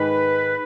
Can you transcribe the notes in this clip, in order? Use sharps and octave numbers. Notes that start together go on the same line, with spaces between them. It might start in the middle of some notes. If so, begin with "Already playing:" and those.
Already playing: G#2 D#3 G#3 B4